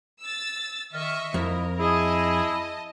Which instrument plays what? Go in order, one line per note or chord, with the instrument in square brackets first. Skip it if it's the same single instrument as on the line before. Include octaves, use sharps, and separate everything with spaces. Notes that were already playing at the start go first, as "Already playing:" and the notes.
[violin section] E6 A6
[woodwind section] D#3 F6 [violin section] D#5 E5 C#6
[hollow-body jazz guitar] F2 [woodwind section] E4 D#5 [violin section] A#4
[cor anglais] E4 [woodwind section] G#4 [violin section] D#5 A5